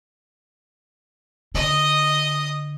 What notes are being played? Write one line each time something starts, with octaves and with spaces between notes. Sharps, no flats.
D3 D#5 D#6